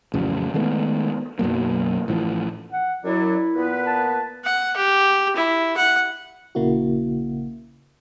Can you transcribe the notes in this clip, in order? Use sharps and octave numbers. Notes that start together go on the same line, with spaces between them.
A1 F2 C#3 F#3
D#3 G#3 A3 B3
B1 F#2 F#3 A#3
A1 A2 E3 F3
F#5
F#2 F#3 E4 D5
A#2 B3 B4
A5
F#5
G4
E4
F#5
A#1 C#3 A#3 E4 F#4